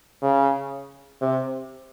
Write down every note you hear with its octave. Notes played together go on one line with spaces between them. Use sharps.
C#3
C3